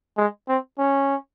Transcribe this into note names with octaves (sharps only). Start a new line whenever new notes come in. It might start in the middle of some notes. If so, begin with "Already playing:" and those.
G#3
C4
C#4